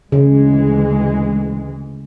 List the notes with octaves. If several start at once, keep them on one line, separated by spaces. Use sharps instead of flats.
D2 C#3 E3 G#3